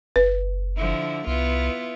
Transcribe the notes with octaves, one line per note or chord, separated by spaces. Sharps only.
F#1 B4
D3 F3 E4
C2 B3 E4 F4